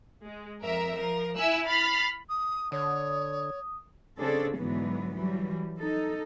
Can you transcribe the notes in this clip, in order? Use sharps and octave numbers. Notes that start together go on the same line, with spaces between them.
G#3
F2 A#4 E5
F3 A#4
E4 E5 G#5 E6 F#6
B5 F6 A6 B6 C7
D#6
D3 C#5 D#6
C#3 C4 D4 G#4 A4
G#2 D3 E3 F#3 B3
E3 F#3 G3
D#4 A4